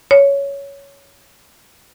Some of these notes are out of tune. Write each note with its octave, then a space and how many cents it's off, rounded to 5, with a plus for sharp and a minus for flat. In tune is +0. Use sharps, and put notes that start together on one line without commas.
C#5 +10